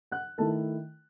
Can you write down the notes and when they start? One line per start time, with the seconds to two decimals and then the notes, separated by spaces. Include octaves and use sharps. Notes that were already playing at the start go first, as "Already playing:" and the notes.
0.11 F#5 F#6
0.38 D#3 A3 E4 A4 A5